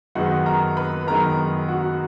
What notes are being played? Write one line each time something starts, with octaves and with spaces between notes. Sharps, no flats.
F#2 D#3 G#3 B3 D#4 F#4 F#5
A#4 A#5
B4 B5
F#2 D#3 G#3 B3 D#4 A#4 A#5
F#4 F#5